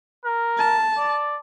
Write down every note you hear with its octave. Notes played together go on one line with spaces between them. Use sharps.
A#4
A5
D5